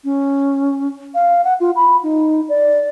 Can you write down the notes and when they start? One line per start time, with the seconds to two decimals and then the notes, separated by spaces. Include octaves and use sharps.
0.04 C#4
1.15 F5
1.45 F#5
1.60 F4
1.76 B5
2.03 D#4
2.49 D5